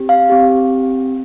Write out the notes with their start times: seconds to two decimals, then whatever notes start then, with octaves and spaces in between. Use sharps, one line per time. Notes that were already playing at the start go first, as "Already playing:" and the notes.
Already playing: C4 G4
0.09 F5
0.29 C4 G4